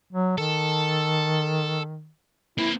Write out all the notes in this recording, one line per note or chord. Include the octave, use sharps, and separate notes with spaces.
F#3
D#3 A4
A#3 C4 E4